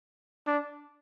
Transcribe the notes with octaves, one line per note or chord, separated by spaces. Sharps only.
D4